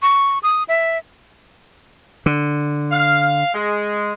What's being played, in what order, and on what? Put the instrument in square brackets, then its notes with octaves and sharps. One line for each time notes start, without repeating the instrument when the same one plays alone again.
[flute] C#6
D#6
E5
[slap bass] D3
[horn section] F5
G#3